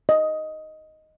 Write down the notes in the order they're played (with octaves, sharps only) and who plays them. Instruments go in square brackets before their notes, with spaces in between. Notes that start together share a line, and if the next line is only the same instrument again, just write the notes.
[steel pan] D#5